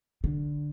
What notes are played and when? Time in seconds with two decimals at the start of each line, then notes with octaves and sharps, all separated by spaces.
0.24 D3